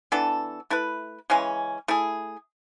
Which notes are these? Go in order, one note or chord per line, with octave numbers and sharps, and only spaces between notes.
E3 B3 D4 A4
A3 E4 B4
C#3 E3 G#3 C#4
A3 E4 G#4